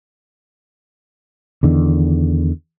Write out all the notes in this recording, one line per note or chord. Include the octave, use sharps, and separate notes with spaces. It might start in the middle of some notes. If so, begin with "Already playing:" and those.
E2 D3 D#3